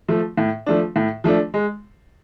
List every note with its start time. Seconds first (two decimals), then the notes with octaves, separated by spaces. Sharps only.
0.08 F3 A3
0.37 A2
0.66 F3 A3 D4
0.96 A2
1.24 F3 A3 D4
1.54 G#3